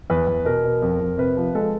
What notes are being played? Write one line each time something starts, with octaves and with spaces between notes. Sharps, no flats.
E2 B4
E2
B2 A#4
B2
F2
F2
C3 B4
F3
G#3 A4